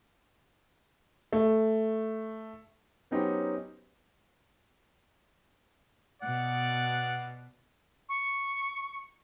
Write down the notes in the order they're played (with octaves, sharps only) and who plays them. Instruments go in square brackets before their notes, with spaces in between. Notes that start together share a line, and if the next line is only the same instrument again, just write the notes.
[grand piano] A3
[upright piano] F#3 B3 C#4 D#4 G4 C5
[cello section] B2 [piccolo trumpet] D5 [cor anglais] F#5
[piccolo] C#6